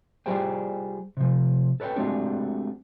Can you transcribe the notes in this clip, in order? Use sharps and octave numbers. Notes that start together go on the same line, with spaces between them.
G3 F4 G4 G#4 C5 G5
C3 F3
A4 B4 C#5 F5 G5
G#3 A3 C4 D4 F#4 G4